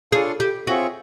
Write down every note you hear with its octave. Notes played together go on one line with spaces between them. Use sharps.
D4 F4 G#4 A4 C#5 F5
G4
C4 F4 F#4 G#4 C#5 E5